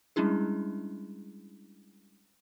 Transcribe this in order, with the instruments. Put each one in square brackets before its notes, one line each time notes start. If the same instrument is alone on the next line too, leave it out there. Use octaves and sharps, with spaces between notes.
[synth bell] G3 G#3 C#4 D4 E4 G#4